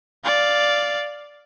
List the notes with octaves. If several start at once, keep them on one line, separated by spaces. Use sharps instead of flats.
D5 F5